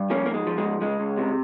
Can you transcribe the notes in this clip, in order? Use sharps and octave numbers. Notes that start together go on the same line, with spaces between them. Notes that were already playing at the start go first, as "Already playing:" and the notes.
Already playing: G2
F3 A#3 C#4
A#3
G#2
G#3
F3
G#3
G#2
C#2 G#3
C#2
C3